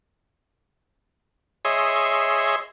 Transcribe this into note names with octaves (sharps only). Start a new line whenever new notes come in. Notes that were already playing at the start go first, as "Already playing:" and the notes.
G#4 C#5 D#5 E5 C6